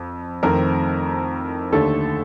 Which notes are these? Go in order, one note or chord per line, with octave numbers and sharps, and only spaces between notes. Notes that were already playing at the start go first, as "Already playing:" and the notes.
Already playing: F2
F2 D#3 A3 C4 A#4
D#2 D3 A3 A4